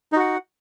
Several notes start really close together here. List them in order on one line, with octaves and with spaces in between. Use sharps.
D#4 F#4 F#5